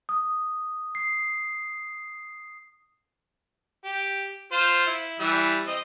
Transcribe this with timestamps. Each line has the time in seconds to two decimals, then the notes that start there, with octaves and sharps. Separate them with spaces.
0.09 D#6
0.95 C7
3.85 G4
4.52 F4 C5
4.86 E4
5.20 E3 G3 E5
5.67 C4 D#5